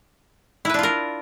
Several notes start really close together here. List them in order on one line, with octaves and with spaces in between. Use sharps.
E4 B4 D4 F4 A#4